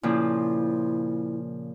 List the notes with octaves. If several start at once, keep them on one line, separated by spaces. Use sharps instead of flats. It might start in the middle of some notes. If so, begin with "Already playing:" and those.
A#2 C#3 F3 E4